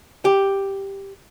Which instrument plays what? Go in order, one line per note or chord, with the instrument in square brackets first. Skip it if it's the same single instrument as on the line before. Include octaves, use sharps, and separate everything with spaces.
[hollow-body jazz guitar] G4